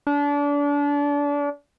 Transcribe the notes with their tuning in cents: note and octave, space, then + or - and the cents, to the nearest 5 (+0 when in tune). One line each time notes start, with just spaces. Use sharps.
D4 -30